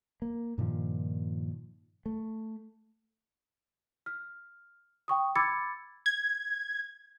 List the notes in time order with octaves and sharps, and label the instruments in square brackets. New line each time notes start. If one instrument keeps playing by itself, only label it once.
[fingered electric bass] A#3
G2 A#2 D#3 F3
A3
[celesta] F6
G5 C#6 D#6
B5 D6 E6 G#6 A6 C#7
[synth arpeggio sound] G#6